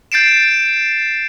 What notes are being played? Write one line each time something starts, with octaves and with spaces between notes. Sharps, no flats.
G6 A6 C7 D7 E7